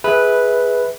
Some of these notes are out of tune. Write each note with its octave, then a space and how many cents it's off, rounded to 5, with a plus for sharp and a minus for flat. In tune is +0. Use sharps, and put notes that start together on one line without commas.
G#4 +0 B4 -5 E5 -25